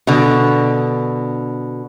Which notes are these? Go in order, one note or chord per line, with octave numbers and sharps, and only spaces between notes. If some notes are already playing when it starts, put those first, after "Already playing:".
B2 D3